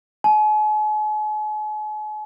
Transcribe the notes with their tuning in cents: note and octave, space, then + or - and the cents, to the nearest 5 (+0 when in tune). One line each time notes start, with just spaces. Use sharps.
G#5 +45